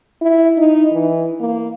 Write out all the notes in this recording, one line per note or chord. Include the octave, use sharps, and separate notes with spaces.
E4
D#4
E3
A#3